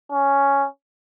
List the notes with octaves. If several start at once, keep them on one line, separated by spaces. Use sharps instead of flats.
C#4